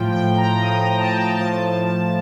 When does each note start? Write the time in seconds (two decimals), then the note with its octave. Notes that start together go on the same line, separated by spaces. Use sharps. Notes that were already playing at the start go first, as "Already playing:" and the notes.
Already playing: A2 F3 G5
0.12 G5
0.37 A#5
0.61 A2 F3 D#6
0.80 D#6
0.98 A5
1.17 G5
1.28 G5
1.35 A2 F3 A5